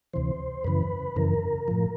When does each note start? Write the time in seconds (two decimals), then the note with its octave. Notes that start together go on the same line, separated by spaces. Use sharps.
0.13 D2 C3 E3 C5
0.64 F#2 C#3 E3 B4
1.16 F#2 C#3 E3 A#4
1.68 A2 F3